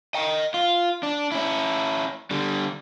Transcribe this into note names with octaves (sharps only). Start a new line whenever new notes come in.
D#5 G5
F4
D4
C#4 E4
D3 G3